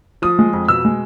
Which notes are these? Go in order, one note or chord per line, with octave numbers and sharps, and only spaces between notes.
F3 D#6
G#3
F2
B2 E6
G#3